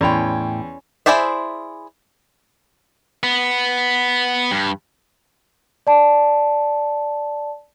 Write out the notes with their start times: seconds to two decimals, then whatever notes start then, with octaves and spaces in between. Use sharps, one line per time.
0.01 E2 A2 C#4 C#5 D5 G5 B5 C6
1.06 E4 G#4 C5 D5 E5
3.23 B3
4.51 G2
5.87 D5 A5